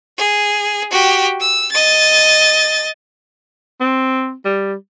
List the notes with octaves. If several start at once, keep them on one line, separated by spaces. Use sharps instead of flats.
G#4
F#4 G4
E6
D#5 A6
C4
G3